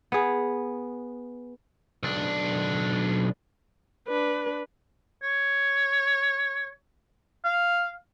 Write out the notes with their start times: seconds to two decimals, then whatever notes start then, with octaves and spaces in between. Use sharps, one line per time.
0.12 B3 G#4
2.03 B1 D4
4.08 D4 B4
5.23 C#5
7.44 F5